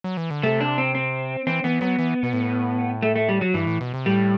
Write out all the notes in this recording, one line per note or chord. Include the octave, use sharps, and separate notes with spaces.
F#3
E3
D3
C3 A3
D4
C4
C4
E3 C4
E3 B3
F#3 B3
E3
B2
A2
A3
A3
G3
F#3
G2 E3
A2
B2
C3
A2 G3